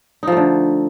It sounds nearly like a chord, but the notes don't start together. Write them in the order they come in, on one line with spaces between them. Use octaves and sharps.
D#4 F3 A3 D3